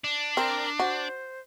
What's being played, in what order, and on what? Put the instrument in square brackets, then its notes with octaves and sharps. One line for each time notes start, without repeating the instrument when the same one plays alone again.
[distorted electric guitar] D4
[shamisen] C4 [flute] A#4
[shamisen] F#4 [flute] C5